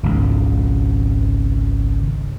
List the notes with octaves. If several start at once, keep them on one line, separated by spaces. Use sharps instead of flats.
G#1 C#2